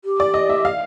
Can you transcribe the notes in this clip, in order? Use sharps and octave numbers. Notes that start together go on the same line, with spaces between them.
G4
D5
D#5
E5
F5